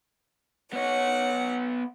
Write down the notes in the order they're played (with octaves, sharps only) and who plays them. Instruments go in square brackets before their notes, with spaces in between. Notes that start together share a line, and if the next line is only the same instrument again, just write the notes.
[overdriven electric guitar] B3 C#5 [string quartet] F#5